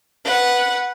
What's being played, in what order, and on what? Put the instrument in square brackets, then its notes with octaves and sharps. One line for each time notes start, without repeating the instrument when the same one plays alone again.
[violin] B4 F#5